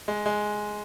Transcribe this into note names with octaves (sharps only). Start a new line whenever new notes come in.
G#3
G#3